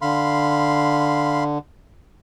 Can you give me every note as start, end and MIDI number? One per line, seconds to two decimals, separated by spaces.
0.02 1.58 50
0.02 1.44 77
0.02 1.44 83
0.02 1.44 84